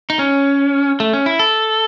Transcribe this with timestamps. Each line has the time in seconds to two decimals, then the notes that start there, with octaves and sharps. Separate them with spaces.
0.10 D#4
0.19 C#4
1.00 A3
1.13 C#4
1.26 E4
1.39 A4